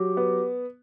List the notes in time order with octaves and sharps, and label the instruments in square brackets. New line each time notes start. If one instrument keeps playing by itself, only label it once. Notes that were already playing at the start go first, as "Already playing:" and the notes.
Already playing: [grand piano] F#3 [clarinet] G4
[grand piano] B3